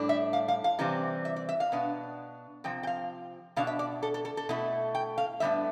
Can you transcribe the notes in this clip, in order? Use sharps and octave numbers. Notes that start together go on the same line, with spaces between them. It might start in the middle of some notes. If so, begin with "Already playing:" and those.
Already playing: A2 G3 D4
E5
F5
F5
F5
C3 E3 G3 C4
E5
D5
E5
F5
B2 B3 D4
C3 F3 C4 G5
G5
F5
B2 B3 D4 F5
E5
D5
A4
A4
A4
A4
B2 A3 E4
G5
F5
A2 G3 B3 D4 E5